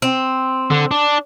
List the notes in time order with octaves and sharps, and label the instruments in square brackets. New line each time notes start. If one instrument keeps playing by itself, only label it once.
[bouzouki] C4
[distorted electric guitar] D3
D4